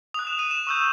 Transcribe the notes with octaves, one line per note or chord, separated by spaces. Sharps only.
D#6 F#6 F7
E7
D#7
E7
C#6 E6 G6